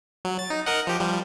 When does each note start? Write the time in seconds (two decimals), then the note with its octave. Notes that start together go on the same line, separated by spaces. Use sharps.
0.25 F#3
0.39 A6
0.50 D#4
0.66 A#4 D#5 F#5
0.87 F3 G4
1.00 F3 G3